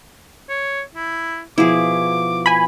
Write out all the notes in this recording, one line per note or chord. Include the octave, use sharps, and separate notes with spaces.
C#5
E4
B2 F3 E4 G#4 D6
G#5 B5